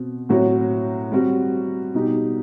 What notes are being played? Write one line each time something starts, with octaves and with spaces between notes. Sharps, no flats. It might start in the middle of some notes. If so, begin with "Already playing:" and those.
Already playing: B2 C4
A2 F#3 C4 F#4
G3 C4 F#4
B2 G3 D#4 G4